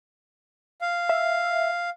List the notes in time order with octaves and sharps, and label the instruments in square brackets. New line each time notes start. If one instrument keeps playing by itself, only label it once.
[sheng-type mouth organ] F5
[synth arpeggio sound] E5